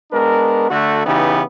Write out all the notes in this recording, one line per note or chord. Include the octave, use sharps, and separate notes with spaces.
G#3 B3 D4 A#4
D3 A3 F#4
C#3 E3 B3 D#4 G4